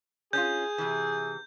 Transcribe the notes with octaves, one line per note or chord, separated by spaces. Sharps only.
C#4 D4 F4 G#4 G6
C3 E3